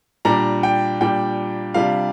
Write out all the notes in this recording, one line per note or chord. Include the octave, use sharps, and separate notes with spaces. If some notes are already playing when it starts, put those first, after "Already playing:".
A#2 G3 D4 A#5
G5
A#2 G3 D4 G5
C3 G3 D4 F4 F5